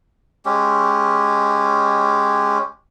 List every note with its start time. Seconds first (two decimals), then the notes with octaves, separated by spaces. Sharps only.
0.46 G#3 C#4 G4